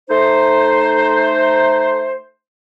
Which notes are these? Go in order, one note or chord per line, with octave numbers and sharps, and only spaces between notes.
A3 D#4 C5